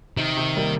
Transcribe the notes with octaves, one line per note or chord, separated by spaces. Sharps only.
C3 D#3
C3
G3 A#3